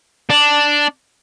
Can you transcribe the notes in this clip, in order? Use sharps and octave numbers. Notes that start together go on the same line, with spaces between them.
D4